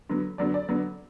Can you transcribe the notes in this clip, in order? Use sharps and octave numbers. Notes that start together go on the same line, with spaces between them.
D3 F#3 B3
D3 F#3 B3 D5
D5
D3 F#3 B3